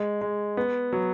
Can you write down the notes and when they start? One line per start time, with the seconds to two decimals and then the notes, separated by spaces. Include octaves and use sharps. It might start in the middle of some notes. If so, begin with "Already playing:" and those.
Already playing: G#3
0.21 G#3
0.57 B3
0.93 F#3